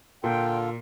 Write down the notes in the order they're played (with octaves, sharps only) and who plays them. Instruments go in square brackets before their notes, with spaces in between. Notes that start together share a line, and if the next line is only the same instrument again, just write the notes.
[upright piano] A#2 [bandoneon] D3 F4 A4 [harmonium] G5